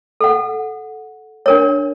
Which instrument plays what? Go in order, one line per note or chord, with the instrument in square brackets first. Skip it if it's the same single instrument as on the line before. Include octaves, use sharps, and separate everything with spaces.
[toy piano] A4 F#5
D4 A#4 C#5